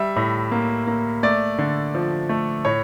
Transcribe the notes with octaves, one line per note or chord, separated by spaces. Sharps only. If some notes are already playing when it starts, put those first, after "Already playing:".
Already playing: G3 E5
A2
A#3
A#3
A3 D5
D3
F3
A3
A2 C#5